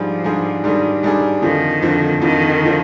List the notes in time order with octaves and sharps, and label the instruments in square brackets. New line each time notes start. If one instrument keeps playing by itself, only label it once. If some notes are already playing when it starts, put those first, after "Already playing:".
Already playing: [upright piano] G#2 G3 D4 G#4 [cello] F3
[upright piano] G#2 G3 D4 G#4
[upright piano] G#2 G3 D4 G#4 [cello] D#3
[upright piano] G#2 G3 D4 G#4
[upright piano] F2 D3 F3 [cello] D#3
[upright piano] F2 D3 F3
[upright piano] F2 D3 F3 [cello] D#3
[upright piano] D3 F3